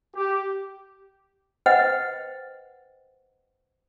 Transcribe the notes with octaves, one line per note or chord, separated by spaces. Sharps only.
G4
B4 C5 D#5 F#5 G5